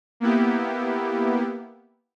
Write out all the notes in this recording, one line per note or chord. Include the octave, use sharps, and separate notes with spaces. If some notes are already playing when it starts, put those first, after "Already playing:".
A#3 B3 E4 G4